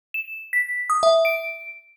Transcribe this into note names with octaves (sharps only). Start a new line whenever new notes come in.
E7
B6
D#6
E5
D7